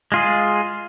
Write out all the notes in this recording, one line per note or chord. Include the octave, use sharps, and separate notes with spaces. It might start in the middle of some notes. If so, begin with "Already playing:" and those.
G#3 F4 G#4